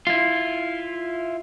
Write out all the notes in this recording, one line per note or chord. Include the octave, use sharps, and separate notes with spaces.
E4 F4